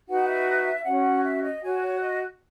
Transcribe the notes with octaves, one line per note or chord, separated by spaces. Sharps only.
D#4 F#4 B4 F#5
E5
C#4 F#4 C#5 F#5
E5
D#5
F#4 C#5 G#5
C#5
D#5